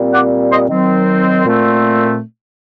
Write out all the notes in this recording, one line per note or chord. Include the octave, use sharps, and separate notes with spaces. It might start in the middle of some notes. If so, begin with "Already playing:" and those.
Already playing: A#2 G3 C4
D5 F#5
C5 D#5
D#3 F#3 C4
A#2 A3 C4